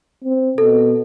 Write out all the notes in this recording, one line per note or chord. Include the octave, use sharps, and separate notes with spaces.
C4
B2 A4